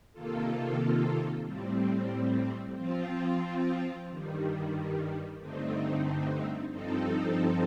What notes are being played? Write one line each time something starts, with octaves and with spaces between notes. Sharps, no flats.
C3 D#3 A#3 F4 A4
A2 G3 C4
F3 C4 F4
G2 D#3 G3
G2 D3 A3 C4 D#4
G2 F3 C4 D#4 A4